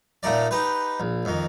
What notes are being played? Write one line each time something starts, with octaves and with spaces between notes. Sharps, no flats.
A#2 A3 D#4 D5
D#4 G4 B4
A#1
F2 D#3